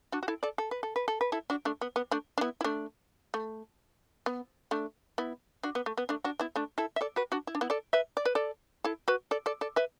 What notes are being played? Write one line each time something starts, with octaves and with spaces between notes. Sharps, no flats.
D4 F#4
F#4
E4 A4
A4 D5
A4
B4
A4
B4
A4
B4
E4 A4
D4 F#4
A3 D4
B3
B3
A3 D4
D4
B3 E4
E4
A3 D4
A3
B3
A3 D4
B3 E4
D4 F#4
B3
A3
B3
A3 D4
D4 F#4
B3 E4
A3 D4
E4 A4
E5
A4 D5
F#4 B4
D4 F#4
E4
D4
B3 E4
A4 D5
B4 E5
D5
B4
A4 D5
E4 A4
F#4 B4
A4 D5
A4 D5
A4 D5
B4 E5